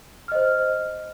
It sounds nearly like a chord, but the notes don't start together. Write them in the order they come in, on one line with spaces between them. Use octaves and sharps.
F6 D#5 C5